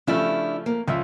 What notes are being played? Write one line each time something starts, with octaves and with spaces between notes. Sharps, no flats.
C#3 F3 A3 D4 E4 G4
A#3
C#2 D3 F3 E5